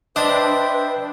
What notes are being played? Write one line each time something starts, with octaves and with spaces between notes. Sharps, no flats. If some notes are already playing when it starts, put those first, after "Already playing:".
D4 B4 C5 D#5 E5 G5